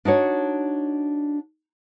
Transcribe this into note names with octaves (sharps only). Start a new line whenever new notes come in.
D4 D#4 F#4 C#5